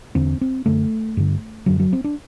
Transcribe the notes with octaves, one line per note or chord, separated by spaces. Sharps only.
E2 D3 C4
C4
F#2 D3 A3
G2 D3
F#2 D3 F#3
F#3
C4
D4